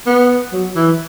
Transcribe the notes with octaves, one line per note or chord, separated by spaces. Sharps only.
B3
F#3
E3